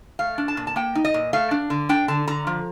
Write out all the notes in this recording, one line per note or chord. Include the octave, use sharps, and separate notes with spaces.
A3 F5
D4
A5
A#2
A5
A#3 G5
D#4
D#5
A#2
A3 F5
D4
D3
D4 G5
D3 A5
D3 A#5
F3